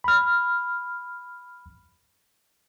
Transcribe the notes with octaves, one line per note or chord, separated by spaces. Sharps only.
B5 F6